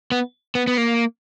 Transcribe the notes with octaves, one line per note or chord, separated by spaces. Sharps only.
B3
B3
B3
A#3